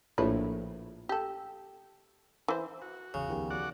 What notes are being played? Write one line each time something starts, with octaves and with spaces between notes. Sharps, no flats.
A#1 A2 B4
G4 A4
E3 C5
F#4
G#1 E2 C#3
D2 D#3 F3 B3 G4
F#4 D5 F#5